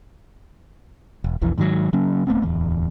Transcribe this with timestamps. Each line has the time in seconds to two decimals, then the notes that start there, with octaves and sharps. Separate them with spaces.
1.24 E1
1.41 E1 B1 F2 E3
1.58 G#2 D#3 F3 F#3
1.93 C#3 F#3 A#3 C#4
2.27 D1 A3 B3 C4
2.42 D1 E2